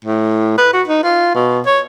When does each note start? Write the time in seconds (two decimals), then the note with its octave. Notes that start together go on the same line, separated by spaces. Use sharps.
0.05 A2
0.58 B4
0.73 F#4
0.87 D#4
1.04 F4
1.35 B2
1.66 C#5